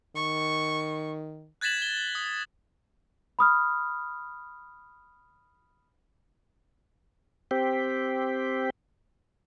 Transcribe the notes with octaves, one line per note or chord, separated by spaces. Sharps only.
D#3 C#6
F#6 G#6 A6 B6 E7 F#7
G7
D#6
B5 D#6 F6
C4 G4